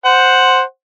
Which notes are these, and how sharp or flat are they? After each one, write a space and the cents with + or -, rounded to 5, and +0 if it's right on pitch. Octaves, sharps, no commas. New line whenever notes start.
C5 +0 F#5 +0